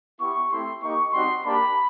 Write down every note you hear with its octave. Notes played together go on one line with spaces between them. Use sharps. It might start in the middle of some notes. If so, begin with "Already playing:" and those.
B3 E4 G4 C#6
A3 C4 E4 G4 C6
A#3 D#4 G4 C#6
G3 C4 D#4 F#4 C6
A#3 D4 G4 B5